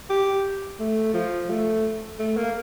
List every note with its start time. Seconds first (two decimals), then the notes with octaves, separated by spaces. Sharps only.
0.10 G4
0.79 A3
1.14 F3
1.49 A3
2.19 A3
2.37 A#3